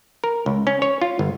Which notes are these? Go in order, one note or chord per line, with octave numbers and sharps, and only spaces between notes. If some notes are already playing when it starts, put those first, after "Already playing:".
A#4
C#2
C#4
C#5
F4
G1